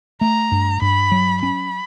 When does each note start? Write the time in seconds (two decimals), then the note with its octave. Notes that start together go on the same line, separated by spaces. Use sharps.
0.21 A3 A#5
0.52 G2
0.82 G2 B5
1.12 F#3
1.42 C#4 B5